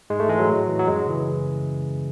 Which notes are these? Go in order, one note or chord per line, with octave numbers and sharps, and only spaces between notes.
G#2 G#3
A3
E3 G#3
F#3
A2
E3
F#3
F#2 G#3
C#3 E3